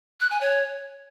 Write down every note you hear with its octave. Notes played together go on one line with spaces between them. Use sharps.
F#6
G#5
C#5